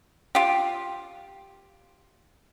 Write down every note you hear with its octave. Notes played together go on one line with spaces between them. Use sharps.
F4 G4